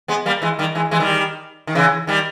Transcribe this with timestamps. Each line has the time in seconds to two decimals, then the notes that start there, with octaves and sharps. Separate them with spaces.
0.08 G#3 B3
0.26 G3 A#3
0.42 E3 G#3
0.59 D#3 G3
0.75 E3 G#3
0.91 E3 G#3
1.00 D#3 G3
1.67 D#3
1.75 C#3 E3
2.07 D#3 G3